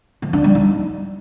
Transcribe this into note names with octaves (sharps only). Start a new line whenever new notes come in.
F3
D4
G3
D#4